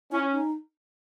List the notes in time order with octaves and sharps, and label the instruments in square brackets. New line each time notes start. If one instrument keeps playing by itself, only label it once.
[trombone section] C#4 [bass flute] E4
[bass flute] D#4